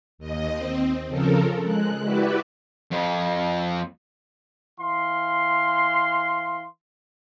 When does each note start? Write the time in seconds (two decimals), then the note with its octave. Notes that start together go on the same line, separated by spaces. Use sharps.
0.18 D#2 D#5
0.52 C4
1.08 C#3 F3 A4 A#4
1.64 G#3 F#6
2.03 E4 F#4 G4 B4 D5 E5
2.91 F2
4.79 E3 F5 C6